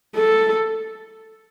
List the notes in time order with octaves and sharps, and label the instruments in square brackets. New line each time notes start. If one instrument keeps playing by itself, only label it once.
[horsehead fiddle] A4